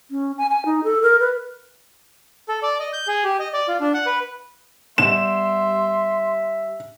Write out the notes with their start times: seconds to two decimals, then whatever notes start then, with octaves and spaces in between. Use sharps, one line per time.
0.11 C#4
0.38 G#5
0.50 G#5
0.65 D#4
0.84 A4
1.03 A#4
1.20 B4
2.49 A4
2.63 D5
2.80 D#5
2.93 G6
3.08 G#4
3.24 G4
3.40 D#5
3.53 D5
3.68 F4
3.80 D4
3.94 F#5
4.06 B4
4.98 G3 B3 E5 C6 E7